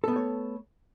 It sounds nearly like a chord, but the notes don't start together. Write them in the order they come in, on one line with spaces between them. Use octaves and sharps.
A4 B3 A3 C#5